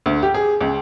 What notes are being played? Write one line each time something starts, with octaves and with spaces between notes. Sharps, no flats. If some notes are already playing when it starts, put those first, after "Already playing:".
D2
G4
G#4
C#2